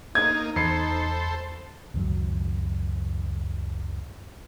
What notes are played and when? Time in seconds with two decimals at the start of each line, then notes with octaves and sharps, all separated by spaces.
0.15 A#3 D#4 D#5 G#6
0.56 E2 A4 C5 B5 C7 C#7
1.94 C#2 F#2 D#3 F#3